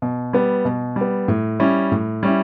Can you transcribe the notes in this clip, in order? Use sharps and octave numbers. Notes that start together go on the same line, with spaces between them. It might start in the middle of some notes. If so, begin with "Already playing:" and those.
B2
G3 B3
B2
G3
B3
A2
G3 C#4 E4
A2
G3 C#4 E4